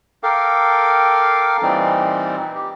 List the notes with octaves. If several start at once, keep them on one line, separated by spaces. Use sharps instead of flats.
A4 A#4 F5 G5 D6
A#2 E3 G3 C4 D#4
G4